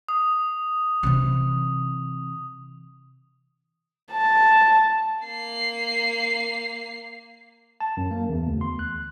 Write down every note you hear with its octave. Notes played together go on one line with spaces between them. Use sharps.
D#6
C3 E3
A5
A#3 C7
A5
F#2
A#3
E2
D2
C6
F#6